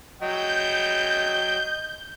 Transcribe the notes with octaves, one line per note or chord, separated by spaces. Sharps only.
F#3 D#5 G5 G6